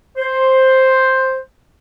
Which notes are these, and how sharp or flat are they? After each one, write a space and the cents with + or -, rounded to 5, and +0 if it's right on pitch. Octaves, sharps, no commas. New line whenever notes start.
C5 +5